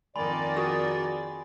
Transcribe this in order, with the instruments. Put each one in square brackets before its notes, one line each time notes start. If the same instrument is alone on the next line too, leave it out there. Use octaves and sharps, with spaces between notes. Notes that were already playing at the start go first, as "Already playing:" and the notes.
[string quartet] F2 D#3 A#3 [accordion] D5 [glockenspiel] G#5 B5 C6
[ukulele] F#4 G#4